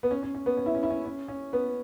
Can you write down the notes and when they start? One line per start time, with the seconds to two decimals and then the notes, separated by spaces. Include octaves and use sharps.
0.03 B3
0.11 C#4
0.23 C#4
0.35 C#4
0.46 B3
0.57 C#4
0.66 E4
0.75 C#4
0.83 E4
0.90 C#4
1.06 C#4
1.28 C#4
1.53 B3